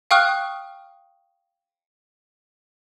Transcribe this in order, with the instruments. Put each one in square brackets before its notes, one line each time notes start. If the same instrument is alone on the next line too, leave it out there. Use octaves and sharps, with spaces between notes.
[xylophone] F5 G5 C#6 D#6 F6 F#6